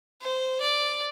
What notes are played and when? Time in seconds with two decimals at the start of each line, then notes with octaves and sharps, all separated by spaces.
0.22 C5
0.61 D5